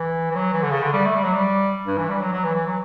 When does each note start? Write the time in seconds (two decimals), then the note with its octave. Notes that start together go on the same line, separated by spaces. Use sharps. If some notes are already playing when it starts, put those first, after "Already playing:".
Already playing: E3
0.31 E3
0.35 F#3
0.53 E3
0.63 D3
0.70 C#3
0.82 D3
0.93 G3
1.05 A3
1.14 G3
1.23 F#3
1.33 G3
1.86 G2
1.98 E3
2.09 G3
2.20 F#3
2.32 F#3
2.44 E3
2.55 E3
2.66 F#3